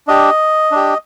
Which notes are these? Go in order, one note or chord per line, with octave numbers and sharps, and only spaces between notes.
D4 G4 D#5
D4 G4